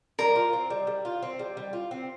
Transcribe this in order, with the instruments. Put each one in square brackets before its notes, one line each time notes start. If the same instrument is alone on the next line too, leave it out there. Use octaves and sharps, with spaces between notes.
[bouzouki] G3 [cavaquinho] A#4
[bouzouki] F4
C4
G3
G3
F4
C4
G3
G3
F4
C4